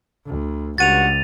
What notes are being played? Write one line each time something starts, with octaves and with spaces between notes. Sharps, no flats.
D2
C#2 G2 F#4 F#5 A6 D#7 F7